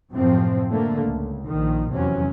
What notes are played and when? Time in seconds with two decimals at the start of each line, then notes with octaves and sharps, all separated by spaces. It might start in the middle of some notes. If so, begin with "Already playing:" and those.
0.11 F#2 A2 C3 F3 C4
0.71 D3 A3 A#3
1.05 C#2
1.46 A#1 D#3
1.92 F1 E2 C3 F#3 C#4